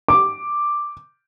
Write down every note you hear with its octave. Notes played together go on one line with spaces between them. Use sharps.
D6